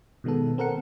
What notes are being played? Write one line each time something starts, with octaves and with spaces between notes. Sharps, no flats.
B2 D#3 G#3 B3 A4
C4 A4 A#4 F#5 C#7